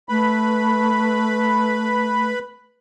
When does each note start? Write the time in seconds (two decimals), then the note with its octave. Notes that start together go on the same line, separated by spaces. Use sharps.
0.09 A3 B4 B5